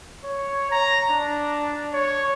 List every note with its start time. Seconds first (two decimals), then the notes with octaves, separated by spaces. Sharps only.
0.24 C#5
0.71 A#5
1.10 D4
1.93 C#5